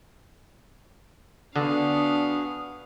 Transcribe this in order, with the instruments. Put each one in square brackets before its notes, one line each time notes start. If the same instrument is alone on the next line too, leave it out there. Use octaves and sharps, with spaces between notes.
[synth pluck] D3 [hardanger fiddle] B3 F5 [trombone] D4 [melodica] F#4 G#4